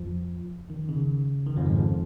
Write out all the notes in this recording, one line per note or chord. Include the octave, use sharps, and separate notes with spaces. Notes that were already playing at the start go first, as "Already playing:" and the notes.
Already playing: F2 F3
D#3
C#3
D#3
F2 F3
G#2 G#3
F2 F3